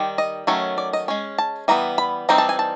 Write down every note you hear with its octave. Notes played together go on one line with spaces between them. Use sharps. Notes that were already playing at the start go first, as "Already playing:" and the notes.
Already playing: D#3 G3
D#5
D#3 F#3 A3 C#4
D5
D#5
G#3 C#4
A5
E3 G3 B3 A#5
B5
E3 G3 C4 D#4 A#5
A5
G#5
A5